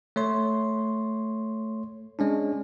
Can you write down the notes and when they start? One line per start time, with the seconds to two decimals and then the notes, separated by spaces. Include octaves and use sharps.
0.16 A3 C#5 C6
2.19 G#3 C#4 D4